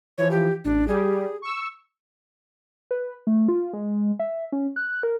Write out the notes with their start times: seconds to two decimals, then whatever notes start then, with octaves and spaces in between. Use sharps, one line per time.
0.18 E3 F3 C#5
0.31 G4
0.65 A1 D4
0.88 G3 G4 G#4
1.42 C#6 E6
2.91 B4
3.27 A3
3.48 F4
3.73 G#3
4.19 E5
4.52 C#4
4.76 F#6
5.03 A#4